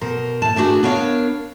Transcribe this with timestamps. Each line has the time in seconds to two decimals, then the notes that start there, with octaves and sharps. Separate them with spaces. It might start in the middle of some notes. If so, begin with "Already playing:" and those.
0.01 B2 A#4 C5
0.42 D#2 A2 A5
0.56 D#3 A3 D4 F#4 G#4
0.83 B3 D4 A#4 C#5 F5